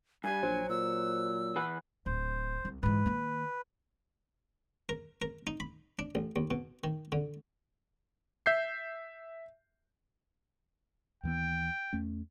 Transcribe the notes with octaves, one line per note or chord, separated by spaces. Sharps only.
G2 G3 G#5
A#1 F#3 C5
A#2 E6
E3 B4 F#5
D1 C5
C2
G#2 E3 B4
D#3 A#3
A#4
A#4
D#4
B5
D4
A1
D#2
B2
D#3
D3
E5 G6 C7
D#2 E3 B3 G5
E2 A3 C#4